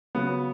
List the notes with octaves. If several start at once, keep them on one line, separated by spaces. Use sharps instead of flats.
C#3 F#3 B3